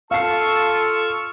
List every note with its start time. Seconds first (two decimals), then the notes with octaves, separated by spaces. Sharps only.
0.11 F4 A4 F5 A5 C#6 E6 F6 C7